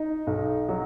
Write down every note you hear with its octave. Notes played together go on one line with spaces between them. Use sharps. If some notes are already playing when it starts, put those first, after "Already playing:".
Already playing: D#4
B1
F#3